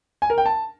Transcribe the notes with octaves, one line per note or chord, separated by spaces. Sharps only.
G#5
A#4
G5
A5